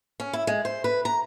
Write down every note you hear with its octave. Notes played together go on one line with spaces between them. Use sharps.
C#4
E4
G#3
C5
B4
A#5